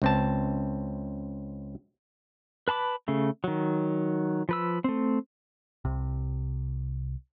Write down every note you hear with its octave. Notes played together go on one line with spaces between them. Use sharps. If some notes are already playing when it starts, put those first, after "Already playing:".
C#2 C4 A5
B4 A5 B5 D6
C#3 A3
D#3 F#3
F3 B4 E6
A3 C4
C2 C3